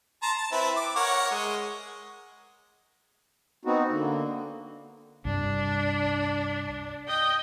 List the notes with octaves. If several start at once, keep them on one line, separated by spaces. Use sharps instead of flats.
A5 A#5 C6
A5
C4 E4 B4
D6
A#4 C#5 F#5
G#3
B3 C4 D#4 F#4
D3 A#3
C2 G2 D4
D#5 G5